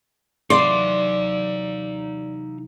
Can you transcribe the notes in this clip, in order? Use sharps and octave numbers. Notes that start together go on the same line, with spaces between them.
C3 E3 F#3 D#4 D5 F5 C6